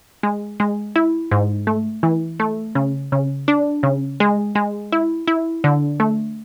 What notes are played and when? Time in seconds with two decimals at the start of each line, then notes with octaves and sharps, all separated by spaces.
0.23 G#3
0.60 G#3
0.96 E4
1.31 G#2
1.67 A3
2.03 E3
2.40 A3
2.75 C#3
3.12 C#3
3.48 D4
3.83 C#3
4.20 G#3
4.55 G#3
4.92 E4
5.28 E4
5.64 D3
6.00 A3